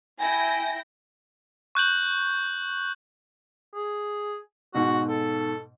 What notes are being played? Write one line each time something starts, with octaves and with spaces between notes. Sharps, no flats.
E4 G5 G#5 A#6
C#6 F#6 G6 F#7
G#4
G#2 B2 F#4
A4